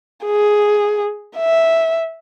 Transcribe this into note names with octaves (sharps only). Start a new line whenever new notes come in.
G#4
E5